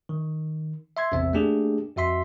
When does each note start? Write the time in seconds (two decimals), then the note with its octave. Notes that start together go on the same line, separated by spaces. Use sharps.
0.09 D#3
0.97 E5 C6 G#6
1.12 A1 E2 C3 C4 E5
1.33 A3 A#3 D4 G4 G#4
1.96 F2 F#4 E5 C6 B6